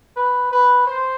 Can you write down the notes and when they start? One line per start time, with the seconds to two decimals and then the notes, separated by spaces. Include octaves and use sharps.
0.16 B4
0.52 B4
0.87 C5